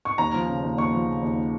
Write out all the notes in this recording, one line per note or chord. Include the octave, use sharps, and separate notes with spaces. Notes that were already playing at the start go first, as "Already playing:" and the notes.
C#6
D#2 A#5
F3
C#3
D#2
D#2 C#6
F3
C#3
D#2